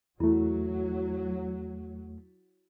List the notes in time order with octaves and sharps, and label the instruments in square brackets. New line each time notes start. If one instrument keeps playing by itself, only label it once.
[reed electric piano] E2 A3 [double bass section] F#3 [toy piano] E4